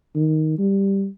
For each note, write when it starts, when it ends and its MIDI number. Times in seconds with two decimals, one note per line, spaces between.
0.15 0.57 51
0.58 1.06 55